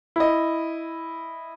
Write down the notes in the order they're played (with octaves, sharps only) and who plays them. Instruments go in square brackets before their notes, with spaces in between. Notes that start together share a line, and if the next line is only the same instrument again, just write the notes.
[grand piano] E4 D#5